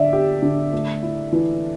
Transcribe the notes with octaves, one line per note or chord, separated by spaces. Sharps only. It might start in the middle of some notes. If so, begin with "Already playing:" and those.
Already playing: D3 D5 E5
G4
D3
A3
E4
E3